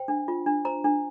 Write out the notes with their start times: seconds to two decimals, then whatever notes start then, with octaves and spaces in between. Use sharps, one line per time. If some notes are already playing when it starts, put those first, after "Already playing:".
Already playing: C5 G5
0.08 D4
0.28 F4
0.46 D4
0.65 C5 A#5
0.84 D4